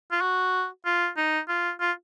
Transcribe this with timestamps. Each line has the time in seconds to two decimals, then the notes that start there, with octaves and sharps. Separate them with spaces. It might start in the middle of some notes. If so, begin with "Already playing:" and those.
0.12 F4
0.21 F#4
0.85 F4
1.17 D#4
1.48 F4
1.80 F4